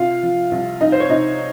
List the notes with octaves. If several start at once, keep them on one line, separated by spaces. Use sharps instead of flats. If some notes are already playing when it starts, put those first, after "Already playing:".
Already playing: C3 F4 F5
F3
C2
C2 D#4 D#5
C5
C#5
C3 D#4 D#5